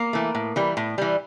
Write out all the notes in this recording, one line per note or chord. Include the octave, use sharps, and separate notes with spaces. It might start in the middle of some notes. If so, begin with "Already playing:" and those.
Already playing: A#3 A#4
E3 A3
A2
E3 G3
A2
E3 G3